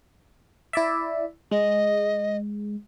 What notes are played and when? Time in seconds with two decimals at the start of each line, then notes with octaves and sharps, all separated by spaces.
0.73 E4 D5 E5
1.51 G#3 D#5